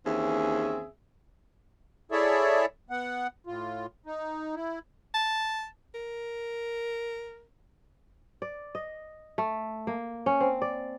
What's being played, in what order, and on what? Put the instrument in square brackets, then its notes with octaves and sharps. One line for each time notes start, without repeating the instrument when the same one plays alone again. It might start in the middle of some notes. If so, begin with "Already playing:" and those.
[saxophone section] D#2 E3 C4 C#4 G#4 E5
[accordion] E4 G#4 A4 C#5 D5 E5
B3 F#5
A2 F4
D#4
E4
[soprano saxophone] A5
A#4
[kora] D5
D#5
A3
A#3
C#4
C4
D5